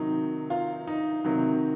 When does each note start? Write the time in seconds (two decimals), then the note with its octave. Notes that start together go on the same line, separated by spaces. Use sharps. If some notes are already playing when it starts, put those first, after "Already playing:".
Already playing: C3 D#3 F#3 D#4
0.50 F4
0.87 D#4
1.25 C3 D#3 F#3